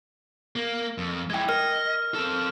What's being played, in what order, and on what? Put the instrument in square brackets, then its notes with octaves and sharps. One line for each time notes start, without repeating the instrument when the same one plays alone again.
[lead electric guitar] A#3
F2
[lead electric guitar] G#3 E4 [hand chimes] G5 G#6
[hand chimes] A#4 [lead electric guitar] D#5 [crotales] F6
[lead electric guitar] C4 A4